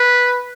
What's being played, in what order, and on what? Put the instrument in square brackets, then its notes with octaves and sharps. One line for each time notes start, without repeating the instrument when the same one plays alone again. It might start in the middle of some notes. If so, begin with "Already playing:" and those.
Already playing: [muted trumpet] B4